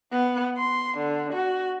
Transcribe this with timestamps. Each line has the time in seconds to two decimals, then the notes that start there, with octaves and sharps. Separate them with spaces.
0.12 B3
0.57 C6
0.97 D3
1.32 F#4